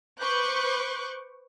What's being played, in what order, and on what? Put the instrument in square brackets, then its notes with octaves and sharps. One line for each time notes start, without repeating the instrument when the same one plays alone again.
[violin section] B4 C5 C#6 D6 F#6 G6